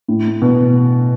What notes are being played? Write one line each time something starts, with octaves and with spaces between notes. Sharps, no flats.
A2
B2